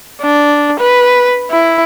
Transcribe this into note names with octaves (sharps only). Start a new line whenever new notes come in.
D4
B4
E4